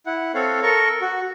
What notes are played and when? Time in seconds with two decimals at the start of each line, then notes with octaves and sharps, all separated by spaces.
0.06 E4 F#5
0.34 C4 A4 C#5 F5
0.62 A4 A#4 C#6
1.01 F#4